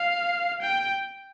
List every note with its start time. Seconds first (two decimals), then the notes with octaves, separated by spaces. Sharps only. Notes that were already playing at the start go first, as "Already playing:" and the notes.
Already playing: F5
0.62 G5